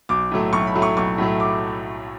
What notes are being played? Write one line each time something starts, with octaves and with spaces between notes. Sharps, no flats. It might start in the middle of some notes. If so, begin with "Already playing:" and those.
B1 D6
A2 F#3 A3
B1 C#6
B5
A2 F#3 A3
C#6
B1 C#6
A2 F#3 A3
D6